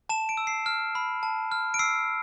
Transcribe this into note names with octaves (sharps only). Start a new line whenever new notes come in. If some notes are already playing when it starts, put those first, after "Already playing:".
A5 E7
D7
E6
C7
F6
B5
A5
F6
D7
E6 C7